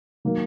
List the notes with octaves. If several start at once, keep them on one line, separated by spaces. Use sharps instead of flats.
D#3 F#3 A#3